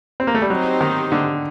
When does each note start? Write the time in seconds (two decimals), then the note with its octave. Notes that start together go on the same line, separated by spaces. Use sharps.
0.20 C4
0.27 A#3
0.35 A3
0.42 G3
0.50 F#3 C4 D#4 G4 C5
0.81 D#3
1.12 D3